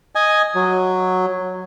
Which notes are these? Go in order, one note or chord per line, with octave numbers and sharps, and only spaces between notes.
D#5 G#5
F#3